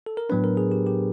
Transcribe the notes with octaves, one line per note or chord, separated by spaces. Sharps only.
A4
A#4
A2 F#3 B3 D4 B4
A#4
G#4
G4
G4